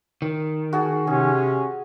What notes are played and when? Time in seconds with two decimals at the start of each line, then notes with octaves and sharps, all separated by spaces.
0.22 D#3
0.73 F#4 G#4 A5
1.07 C3 C#4 G#4